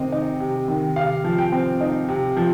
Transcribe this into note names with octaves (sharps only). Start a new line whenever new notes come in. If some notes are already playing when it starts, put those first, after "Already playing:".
Already playing: C3 D#3 C4 D#5
D#4
C3
D#3
C3 F5
F3
G5
C4
D#4
C3
F3